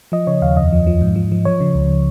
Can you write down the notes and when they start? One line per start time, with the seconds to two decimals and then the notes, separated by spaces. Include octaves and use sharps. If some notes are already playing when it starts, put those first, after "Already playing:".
0.12 F3 D#5
0.27 C#3 C#5
0.42 D#2 F5
0.57 F2 D#5
0.72 F3
0.87 F3
1.02 G#2
1.16 F3
1.32 F3
1.45 F3 C#5
1.60 C#3
1.75 C#2